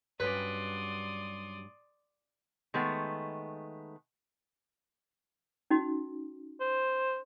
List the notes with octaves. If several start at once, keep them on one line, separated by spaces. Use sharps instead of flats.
G2 F#3 C#4 B4 D5 C6 D#6
D#3 G#3 A3 B3
C#4 D#4 F#4
C5